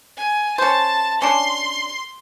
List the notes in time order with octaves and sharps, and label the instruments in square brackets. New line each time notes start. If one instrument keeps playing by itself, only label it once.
[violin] G#5
[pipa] C#4 C5 [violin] A5
[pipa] C#4 D4 [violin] C6